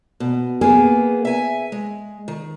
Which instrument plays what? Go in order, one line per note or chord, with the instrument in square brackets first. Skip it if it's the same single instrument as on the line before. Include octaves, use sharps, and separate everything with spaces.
[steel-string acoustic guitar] B2
[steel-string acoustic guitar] A#3 B3 [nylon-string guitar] G#4
[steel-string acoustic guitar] E5 G#5
G#3
D#3